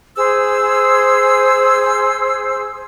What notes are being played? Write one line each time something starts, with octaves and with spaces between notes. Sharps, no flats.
G#4 C5 E6